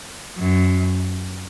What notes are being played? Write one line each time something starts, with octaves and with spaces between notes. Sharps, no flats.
F#2